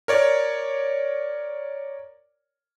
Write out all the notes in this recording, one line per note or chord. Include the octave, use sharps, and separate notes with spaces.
A#4 C#5 D5